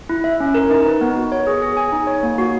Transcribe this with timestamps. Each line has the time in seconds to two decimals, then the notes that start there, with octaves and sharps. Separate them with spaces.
0.09 E4
0.24 E5
0.40 C#4
0.54 A#4
0.71 D#4
0.86 B4
1.01 B3
1.16 F#4
1.32 C#5
1.47 G#4
1.62 G#4
1.77 G#5
1.92 D#4
2.07 C#5
2.23 A#3
2.38 F#4